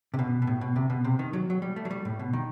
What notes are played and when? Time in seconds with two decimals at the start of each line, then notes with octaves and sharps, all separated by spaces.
0.14 C3
0.19 B2
0.42 B2
0.47 A2
0.61 B2
0.76 C3
0.90 B2
1.04 C3
1.19 D#3
1.33 F#3
1.50 F#3
1.62 G3
1.76 A3
1.85 F#3
1.91 G3
2.05 A2
2.19 B2
2.33 D#3